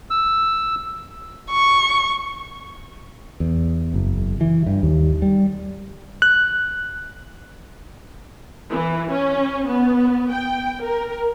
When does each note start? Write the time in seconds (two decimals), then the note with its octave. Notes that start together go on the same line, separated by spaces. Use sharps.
0.10 E6
1.51 C#6
3.40 E2
3.94 F#1
4.41 E3
4.66 G2
4.83 D#2
5.22 G3
6.22 F#6
8.71 E3
9.11 C#4
9.67 B3
10.31 G5
10.82 A#4